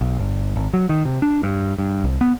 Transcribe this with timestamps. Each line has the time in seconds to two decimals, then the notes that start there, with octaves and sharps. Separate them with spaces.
0.01 B1
0.20 G1
0.56 G#1
0.73 F#3
0.89 D#3
1.05 C3
1.22 D4
1.43 G2
1.78 G2
2.04 C2
2.21 B3